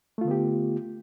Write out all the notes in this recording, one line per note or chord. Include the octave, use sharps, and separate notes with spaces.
D3 A3 B3 F4 G4